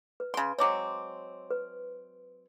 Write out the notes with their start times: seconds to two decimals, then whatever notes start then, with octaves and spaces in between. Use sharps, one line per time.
0.20 B4
0.34 C#3 G#5 C6
0.59 F#3 G#3 C4 C#5 D6
1.51 B4